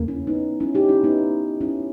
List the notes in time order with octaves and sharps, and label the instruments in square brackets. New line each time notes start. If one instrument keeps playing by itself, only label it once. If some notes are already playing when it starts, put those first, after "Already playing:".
Already playing: [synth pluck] E2 C#3 A#3
[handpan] C#4 E4
B3 D#4
C#4 E4
D#4 G4
C#4 E4
B3 D#4
C#4 E4